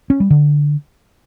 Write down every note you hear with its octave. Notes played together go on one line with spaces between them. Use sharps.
C#4
G3
D3